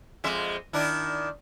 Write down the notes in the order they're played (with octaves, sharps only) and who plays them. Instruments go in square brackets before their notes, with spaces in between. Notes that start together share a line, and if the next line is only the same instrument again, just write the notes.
[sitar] F2 G#3 E5
D#3 D4 E4